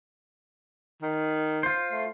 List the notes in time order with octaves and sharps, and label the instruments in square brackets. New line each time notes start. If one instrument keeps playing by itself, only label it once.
[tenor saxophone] D#3
[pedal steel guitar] F4 C5
[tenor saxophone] A3